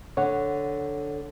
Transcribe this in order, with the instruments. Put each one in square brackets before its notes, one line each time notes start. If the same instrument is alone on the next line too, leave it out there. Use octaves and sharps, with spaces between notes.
[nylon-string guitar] D3 [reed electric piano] C#5 F#5